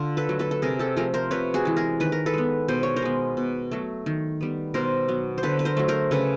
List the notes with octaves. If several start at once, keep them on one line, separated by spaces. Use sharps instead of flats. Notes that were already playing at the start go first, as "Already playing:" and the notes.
Already playing: D3 F4
A4 B4
F#3 A3
A4 B4
A4
C3 G#4 A#4
G4 A4
F3 A3 G#4 A#4
A#4 C5
C3 B4 C#5
F#4 G#4
E3 G#3
G#4 A#4
D#3 B4
A#4
A4 B4
G#3 B3
B2 C5
C#5
A#4 C5
G#3 B3
B2
F#3 A3
D#3
G3 B3
B2 A#4 C5
F#3 B3
C5
D3 A4 B4
B4
A#4 C5
F#3 A3
A#4 C5
C#3 A4 B4